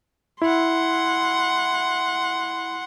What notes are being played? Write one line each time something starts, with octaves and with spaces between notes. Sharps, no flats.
E4 F#5 C6